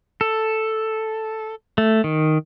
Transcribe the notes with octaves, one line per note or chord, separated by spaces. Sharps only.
A4
A3
D#3